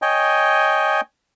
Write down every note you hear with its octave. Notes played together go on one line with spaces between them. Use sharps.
C#5 D#5 G5 G#5